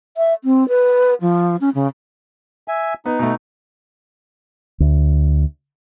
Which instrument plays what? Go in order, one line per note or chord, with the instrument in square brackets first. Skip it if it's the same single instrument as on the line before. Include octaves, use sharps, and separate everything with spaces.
[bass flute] E5
C4
B4
F3
C#4
C#3
[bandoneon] E5 G#5
[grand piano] B3 [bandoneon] D#4
[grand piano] B2 A3
[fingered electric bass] D2